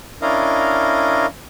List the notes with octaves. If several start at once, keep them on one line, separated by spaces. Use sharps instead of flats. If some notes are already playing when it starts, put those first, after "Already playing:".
C#4 D4 E4 A#4 D#5 F5